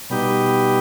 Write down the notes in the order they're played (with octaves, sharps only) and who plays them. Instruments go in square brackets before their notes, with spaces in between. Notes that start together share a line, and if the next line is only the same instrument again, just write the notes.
[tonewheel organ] B2 G3 B3 D#4 G4